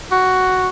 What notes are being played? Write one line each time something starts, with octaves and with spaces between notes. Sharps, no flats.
F#4